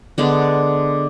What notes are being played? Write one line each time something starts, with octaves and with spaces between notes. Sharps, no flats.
D3 G#3 B3 D4